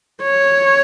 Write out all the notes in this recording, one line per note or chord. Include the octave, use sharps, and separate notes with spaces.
C#5